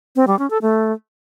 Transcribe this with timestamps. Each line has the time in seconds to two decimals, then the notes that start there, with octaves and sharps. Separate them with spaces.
0.16 C4
0.27 G3
0.39 C#4
0.50 A4
0.62 A3